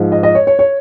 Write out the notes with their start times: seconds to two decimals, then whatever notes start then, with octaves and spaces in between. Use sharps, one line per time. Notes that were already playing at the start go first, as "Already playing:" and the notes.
Already playing: G#2 F3
0.12 D#5
0.23 D#5
0.35 C#5
0.47 C#5
0.59 C#5